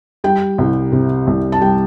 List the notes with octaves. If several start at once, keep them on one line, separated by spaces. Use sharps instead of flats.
G3 G5
C2
C3
C2
A5
G3 G5